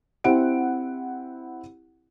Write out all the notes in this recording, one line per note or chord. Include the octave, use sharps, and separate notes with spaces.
C4 E4 G4 F#5 D7